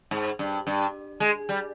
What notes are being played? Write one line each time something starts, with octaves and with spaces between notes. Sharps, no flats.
G#2
G2
G2
G#3
G3